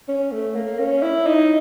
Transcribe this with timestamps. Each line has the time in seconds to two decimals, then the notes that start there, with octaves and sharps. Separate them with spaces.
0.08 C#4
0.32 A3
0.55 A#3
0.79 C#4
1.03 E4
1.27 D#4